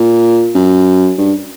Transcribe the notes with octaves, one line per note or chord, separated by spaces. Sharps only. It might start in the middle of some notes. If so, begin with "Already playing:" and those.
Already playing: A#2
F#2
G2